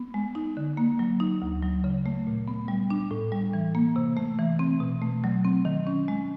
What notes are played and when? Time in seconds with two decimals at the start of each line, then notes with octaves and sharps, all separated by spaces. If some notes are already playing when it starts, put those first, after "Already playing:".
Already playing: B3
0.14 G#3
0.35 D#4
0.57 D3
0.77 A#3
0.99 F#3
1.20 D#4
1.42 D2
1.63 F#3
1.84 C#3
2.06 A3
2.27 A#2
2.48 B3
2.68 G3
2.90 D4
3.11 A2
3.32 G3
3.53 E3
3.75 A#3
3.96 C3
4.17 A3
4.39 E3
4.59 C4
4.80 B2
5.02 A3
5.24 F#3
5.45 C4
5.65 D#3
5.87 C#4
6.08 G#3